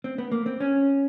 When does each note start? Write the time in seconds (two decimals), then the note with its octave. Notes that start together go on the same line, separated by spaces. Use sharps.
0.04 C4
0.18 B3
0.32 A#3
0.46 C4
0.60 C#4